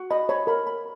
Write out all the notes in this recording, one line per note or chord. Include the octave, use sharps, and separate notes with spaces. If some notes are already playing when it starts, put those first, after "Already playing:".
Already playing: F#4
D#5 B5
C#5 B5
A#4 B5
B5